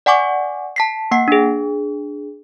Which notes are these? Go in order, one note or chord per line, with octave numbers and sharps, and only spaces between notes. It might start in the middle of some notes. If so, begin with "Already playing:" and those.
D5 F#5 G#5 C#6 D6
A5 B6 C7
A#3 F#5 C7
D4 G#4